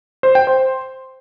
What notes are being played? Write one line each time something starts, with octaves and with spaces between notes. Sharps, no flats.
C5
G5
C5